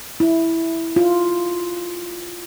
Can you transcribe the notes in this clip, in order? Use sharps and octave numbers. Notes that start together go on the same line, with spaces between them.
E4
F4